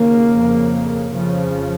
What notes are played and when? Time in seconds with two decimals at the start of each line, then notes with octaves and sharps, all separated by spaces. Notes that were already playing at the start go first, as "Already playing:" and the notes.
Already playing: D#2 C#3 A#3
0.34 F2 C#3
1.13 F2 C#3 F3